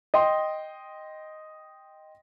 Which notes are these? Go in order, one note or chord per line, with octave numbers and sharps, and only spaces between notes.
D#5 G5 C6